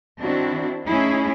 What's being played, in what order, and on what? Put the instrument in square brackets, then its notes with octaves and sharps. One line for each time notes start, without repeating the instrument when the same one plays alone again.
[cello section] D#3 C4 D4 E4 F#4
A3 C#4 D#4 E4 G#4